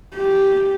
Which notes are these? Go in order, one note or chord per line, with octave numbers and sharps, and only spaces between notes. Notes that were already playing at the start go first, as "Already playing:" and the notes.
G4